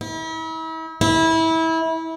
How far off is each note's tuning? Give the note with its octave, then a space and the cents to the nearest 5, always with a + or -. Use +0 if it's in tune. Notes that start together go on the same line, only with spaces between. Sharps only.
E4 -40
E4 -25